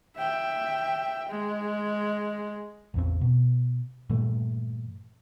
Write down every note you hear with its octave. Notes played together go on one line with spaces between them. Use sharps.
E5 G5
G#3
A1 E2 C4
B2
G2 A#2 E3 A3